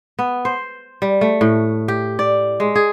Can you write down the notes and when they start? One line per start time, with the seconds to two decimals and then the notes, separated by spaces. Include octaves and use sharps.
0.19 B3
0.45 C5
1.02 G3
1.21 A3
1.41 A2
1.88 G4
2.19 D5
2.60 G#3
2.75 G#4